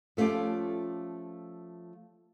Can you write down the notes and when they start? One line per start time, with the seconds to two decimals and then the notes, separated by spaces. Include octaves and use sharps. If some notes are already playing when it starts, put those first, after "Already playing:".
0.17 F3 A3 C#4 F4 G4